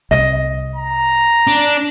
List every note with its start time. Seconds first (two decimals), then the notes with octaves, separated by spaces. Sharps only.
0.11 C2 D#5
0.76 A#5
1.47 D4